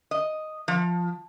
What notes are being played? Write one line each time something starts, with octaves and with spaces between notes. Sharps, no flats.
D#5
F3